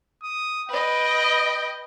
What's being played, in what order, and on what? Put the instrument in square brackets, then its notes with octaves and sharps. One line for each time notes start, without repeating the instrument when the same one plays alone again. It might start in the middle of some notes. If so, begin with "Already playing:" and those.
[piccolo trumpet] D#6
[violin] B4 D#5 [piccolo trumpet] G5